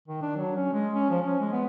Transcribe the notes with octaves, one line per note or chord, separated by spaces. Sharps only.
D#3
D4
F#3
C#4
G#3
C#4
F3
C#4
G#3
B3